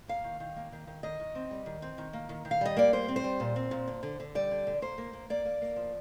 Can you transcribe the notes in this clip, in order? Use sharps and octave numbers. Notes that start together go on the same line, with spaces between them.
A#3 F5
D#3
D#3
A#3
D#3
D#3
D#3 D#5
D#3
C4
G3
D#3
C4
D#3
A#3
D#3
D#3
F5
G3 D#5
A#3 D5
G3 C5
C4
C5
G3
A#2
C4
A#2
D3
D3
D3
G3 D5
D3
D3
A#3 C5
A#3
A#3
A#3 D5
A#3
A#3
F3